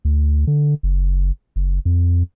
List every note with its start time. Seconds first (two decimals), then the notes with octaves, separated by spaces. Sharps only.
0.05 D2
0.47 D3
0.83 F#1
1.56 F#1
1.85 F2